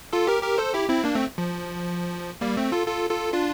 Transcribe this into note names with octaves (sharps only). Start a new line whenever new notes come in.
F4 A4
G4 A#4
G4 A#4
A4 C5
E4 G4
C4 E4
A#3 D4
A3 C4
F3
G3 A#3
A3 C4
F4 A4
F4 A4
F4 A4
D4 F4